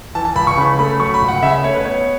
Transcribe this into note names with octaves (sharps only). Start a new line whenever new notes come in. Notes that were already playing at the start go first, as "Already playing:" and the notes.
E3 A5
A5
C#2 B5
C#6
C#3 B5
A3 B5
F#3 C#6
B5
C#2
F#5
C#3 E5
A3 C#5
B4
B3 C#5